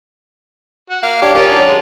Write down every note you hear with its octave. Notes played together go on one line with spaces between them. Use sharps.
F#4
A#3 F5
D4 G4 C#5 F5
D#2 D#3 C#4 F4 G4
F#3 D4
G#3